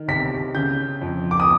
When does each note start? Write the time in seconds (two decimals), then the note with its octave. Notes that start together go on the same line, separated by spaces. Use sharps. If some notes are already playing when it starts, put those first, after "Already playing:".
Already playing: D#3
0.08 C3 B6
0.55 C#3 G6
1.01 F2
1.31 D6
1.40 D#6